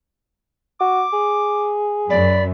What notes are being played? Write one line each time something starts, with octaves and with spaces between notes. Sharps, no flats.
F#4 D6
G#4
F#2 D5 B5